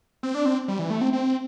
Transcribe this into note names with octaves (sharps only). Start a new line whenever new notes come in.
C4
D4
C4
G3
E3
A3
C4
C4